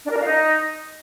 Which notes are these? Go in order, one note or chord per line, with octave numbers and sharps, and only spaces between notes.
D4
A#4
D4
F5
D#4